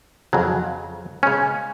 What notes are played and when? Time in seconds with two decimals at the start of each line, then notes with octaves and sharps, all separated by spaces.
0.33 F2 C#3 F#3
1.23 C#3 G#3 C#4